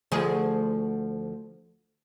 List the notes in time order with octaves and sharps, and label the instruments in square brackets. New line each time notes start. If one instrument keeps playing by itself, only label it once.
[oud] D2 F3 G#4